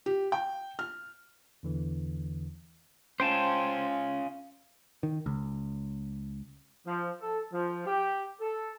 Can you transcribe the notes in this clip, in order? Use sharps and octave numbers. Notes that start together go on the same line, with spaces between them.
G4
G5
F6
E2 D3 E3
C#4 F4 C5 G5 A5
D#3
C#2
F3
A4
F3
G4
A4